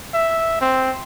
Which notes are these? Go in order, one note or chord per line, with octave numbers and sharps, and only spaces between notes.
E5
C4